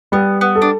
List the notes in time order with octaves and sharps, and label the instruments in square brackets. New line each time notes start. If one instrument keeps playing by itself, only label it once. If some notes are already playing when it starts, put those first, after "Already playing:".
[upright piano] G3 [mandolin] B3
[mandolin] B3
[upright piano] A4
[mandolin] D4